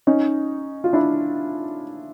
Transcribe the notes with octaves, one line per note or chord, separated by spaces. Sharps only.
C#4 D#4
F4
D4 E4